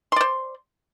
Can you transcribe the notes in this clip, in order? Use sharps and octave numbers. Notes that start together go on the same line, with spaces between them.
C5 D5 C6